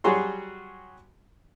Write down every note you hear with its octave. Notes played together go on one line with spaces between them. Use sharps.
F#3 G3 F#4 G#4 C#5 C6